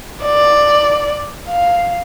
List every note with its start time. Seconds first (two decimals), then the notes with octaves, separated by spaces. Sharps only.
0.24 D5
1.48 F5